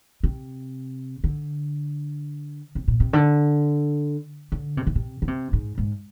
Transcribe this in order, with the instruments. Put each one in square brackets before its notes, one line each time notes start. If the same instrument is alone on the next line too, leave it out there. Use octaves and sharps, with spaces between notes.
[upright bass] C3
D3
C3
A#2
C3
D3
D3
C3
D3
C3
D3
C3
G#2
G#2